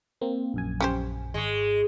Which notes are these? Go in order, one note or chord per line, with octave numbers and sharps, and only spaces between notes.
A#3 C4
A#1 F#2 G#5
C#4 G4 C5
G#1 G#3 C#6